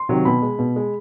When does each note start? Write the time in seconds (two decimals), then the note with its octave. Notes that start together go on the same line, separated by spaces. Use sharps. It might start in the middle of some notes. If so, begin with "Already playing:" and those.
Already playing: C6
0.09 C3 D#3 F#3
0.25 B2 B5
0.42 G#3
0.59 B2
0.76 G#3